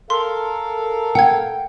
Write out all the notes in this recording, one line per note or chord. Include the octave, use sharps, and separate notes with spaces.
A4 A#4 F5 C6
F#5 G5 G#6